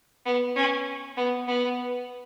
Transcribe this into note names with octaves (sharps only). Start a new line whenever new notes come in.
B3
C#4
B3
B3